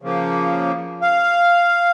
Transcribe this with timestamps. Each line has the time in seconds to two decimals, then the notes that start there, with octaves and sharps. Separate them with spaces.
0.02 C#3 F3 A#3
1.02 F5